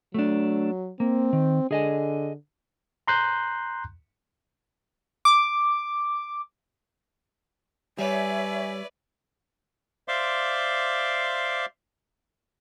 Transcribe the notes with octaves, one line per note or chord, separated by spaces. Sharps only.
F#3 A3 D4
A#3 C4
D#3
D3 G#4 D#5 G#5
A#5 C6 F#6 G6
D6
G3 B4 C#5 D5 E5 G#5
C5 D5 E5 F5 C6 D6